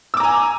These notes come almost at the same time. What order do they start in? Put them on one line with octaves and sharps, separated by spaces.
E6 D6 A#5 G#5